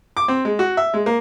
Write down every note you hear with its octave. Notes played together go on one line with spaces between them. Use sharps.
D6
C4
G#3
F#4
E5
G#3
A#3